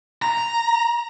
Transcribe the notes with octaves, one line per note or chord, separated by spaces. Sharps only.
A#5